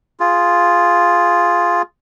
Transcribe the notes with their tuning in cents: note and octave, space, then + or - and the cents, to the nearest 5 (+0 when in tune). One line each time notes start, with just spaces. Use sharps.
F4 +0 G#4 +0